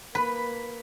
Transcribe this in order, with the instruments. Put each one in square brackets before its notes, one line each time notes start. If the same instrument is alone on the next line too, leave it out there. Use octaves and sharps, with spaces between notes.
[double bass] A#3 [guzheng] B4 [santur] B5